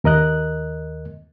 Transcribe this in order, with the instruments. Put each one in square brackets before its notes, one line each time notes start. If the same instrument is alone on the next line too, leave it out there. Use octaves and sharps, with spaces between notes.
[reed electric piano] D#2 A#4 D#5 F#6